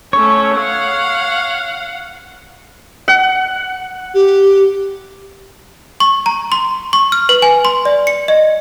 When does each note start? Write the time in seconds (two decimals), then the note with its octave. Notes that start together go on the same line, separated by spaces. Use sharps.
0.13 A3 C#4 C#5
0.57 F5 F#5
3.08 F#5
4.14 G4
6.00 C#6
6.26 A#5
6.52 C6
6.93 C#6
7.12 F6
7.29 B4
7.42 G#5
7.65 C6
7.85 D5
8.07 C#7
8.28 D#5